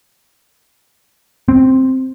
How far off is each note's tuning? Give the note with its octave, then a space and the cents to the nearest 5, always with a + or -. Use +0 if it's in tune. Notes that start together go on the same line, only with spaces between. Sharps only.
C4 +0